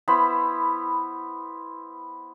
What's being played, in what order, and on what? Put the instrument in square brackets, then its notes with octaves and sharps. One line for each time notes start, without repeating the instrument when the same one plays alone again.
[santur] B3 E4 C5 B5